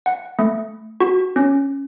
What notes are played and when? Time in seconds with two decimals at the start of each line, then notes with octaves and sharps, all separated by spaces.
0.06 F#5
0.39 A3
1.00 F#4
1.36 C#4